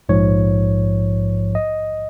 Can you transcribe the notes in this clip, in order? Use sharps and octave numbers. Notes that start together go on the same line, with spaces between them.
A#1 G#2 F3 C#5
D#5